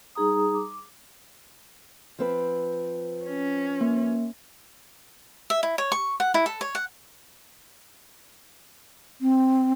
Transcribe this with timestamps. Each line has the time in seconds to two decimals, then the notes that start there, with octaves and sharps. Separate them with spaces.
0.15 G3 D#4 G#4 A#5 D#6
0.54 D6
2.19 F3 C4 B4
3.25 C#4
3.81 A#3
5.50 E5
5.63 E4
5.78 C#5
5.92 C#6
6.20 F#5
6.34 E4
6.46 A4
6.61 C#5
6.75 F#5
9.21 C4